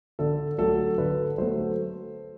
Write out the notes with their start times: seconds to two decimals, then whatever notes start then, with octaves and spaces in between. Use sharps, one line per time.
0.19 D3 A4
0.58 F#3 A3 A4
0.98 D3 B4
1.38 F#3 A3 C5